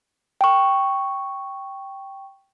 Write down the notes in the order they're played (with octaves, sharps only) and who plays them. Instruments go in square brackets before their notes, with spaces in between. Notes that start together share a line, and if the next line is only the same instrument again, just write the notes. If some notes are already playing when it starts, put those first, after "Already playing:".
[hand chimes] G5 C#6